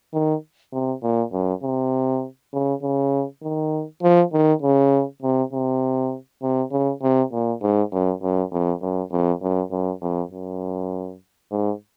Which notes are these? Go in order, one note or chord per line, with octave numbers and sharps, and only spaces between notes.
D#3
C3
A#2
F#2
C3
C#3
C#3
D#3
F3
D#3
C#3
C3
C3
C3
C#3
C3
A#2
G#2
F#2
F#2
F2
F#2
F2
F#2
F#2
F2
F#2
G#2